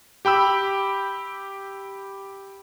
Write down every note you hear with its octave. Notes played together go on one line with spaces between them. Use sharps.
G4 G5 B5 E6